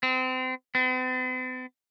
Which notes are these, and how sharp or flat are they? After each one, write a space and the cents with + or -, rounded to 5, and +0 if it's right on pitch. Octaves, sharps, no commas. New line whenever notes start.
C4 -30
C4 -45